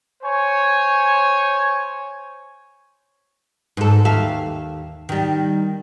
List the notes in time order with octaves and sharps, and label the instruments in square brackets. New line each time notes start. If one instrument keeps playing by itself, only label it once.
[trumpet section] C5 C#5 G#5 C#6
[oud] G#2 A4
D#2 E5 F5
D#3 G3